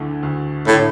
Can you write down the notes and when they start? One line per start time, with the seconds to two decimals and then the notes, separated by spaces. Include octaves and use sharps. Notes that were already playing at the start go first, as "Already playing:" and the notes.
Already playing: D2 D3 A3 E4
0.23 D2
0.67 A2 D3 A3 E4